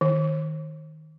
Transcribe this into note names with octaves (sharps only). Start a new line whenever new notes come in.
D#3